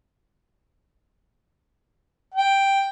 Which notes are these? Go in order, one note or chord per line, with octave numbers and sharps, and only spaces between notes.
G5